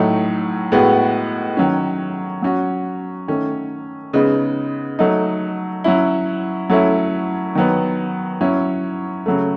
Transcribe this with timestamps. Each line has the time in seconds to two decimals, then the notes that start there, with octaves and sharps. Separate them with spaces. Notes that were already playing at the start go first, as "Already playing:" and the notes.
Already playing: A2 F#3 A3 D#4
0.72 A2 G#3 B3 F#4
1.57 D#3 F#3 C#4
2.42 F#3 C#4 F#4
3.28 D#3 A3 C#4
4.13 C#3 G#3 B3 D#4
4.99 F#3 A3 D#4
5.84 F#3 C#4 E4
6.70 F#3 A3 C#4 E4
7.55 D#3 F#3 B3
8.41 F#3 C#4 E4
9.26 C#3 F#3 A3